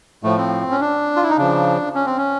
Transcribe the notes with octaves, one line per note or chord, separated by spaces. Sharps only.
A2 F3 A3
C4
C#4
D4
F4
E4
D#4
C#3 F3 D4
C#4
C4
C#4